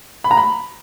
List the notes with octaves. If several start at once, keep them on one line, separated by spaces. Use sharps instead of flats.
B5
A#5
B5